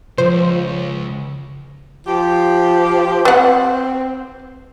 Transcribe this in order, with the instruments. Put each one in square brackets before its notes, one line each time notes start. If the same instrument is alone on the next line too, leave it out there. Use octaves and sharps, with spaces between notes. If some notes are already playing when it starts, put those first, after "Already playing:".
[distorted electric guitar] C#2 [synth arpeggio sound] F3 [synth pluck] C5
[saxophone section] F3 G4
[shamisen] B3 F#5 [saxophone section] C4